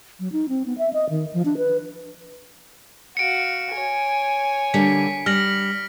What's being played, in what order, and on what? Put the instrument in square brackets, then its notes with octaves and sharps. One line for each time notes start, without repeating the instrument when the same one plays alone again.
[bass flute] F#3
D#4
C4
B3
E5
D#5
D#3
F3
D4
B4
[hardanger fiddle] F#4 F5 [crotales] C#7 D7
[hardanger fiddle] C#5 G#5
[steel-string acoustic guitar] D3 G3 A#3 [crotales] B6
[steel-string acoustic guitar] G3 [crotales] F6 A#6 F#7